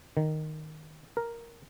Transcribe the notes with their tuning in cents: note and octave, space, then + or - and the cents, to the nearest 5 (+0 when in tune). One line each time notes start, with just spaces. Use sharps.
D#3 -5
A#4 +0